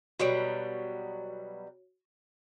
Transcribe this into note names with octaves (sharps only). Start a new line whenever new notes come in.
B2 F#3 G3 F#4 C#5 D7